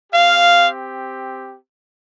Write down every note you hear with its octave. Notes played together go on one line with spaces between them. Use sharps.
C4 G4 F5